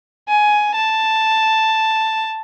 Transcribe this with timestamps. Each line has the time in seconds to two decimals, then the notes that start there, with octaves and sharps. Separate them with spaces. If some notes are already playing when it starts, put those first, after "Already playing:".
0.29 G#5
0.76 A5